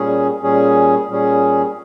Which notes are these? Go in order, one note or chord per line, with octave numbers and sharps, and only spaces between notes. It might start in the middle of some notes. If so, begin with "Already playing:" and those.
Already playing: A#2 G3 C#4 G#4
A#2 G3 C#4 G#4
A#2 G3 C#4 G#4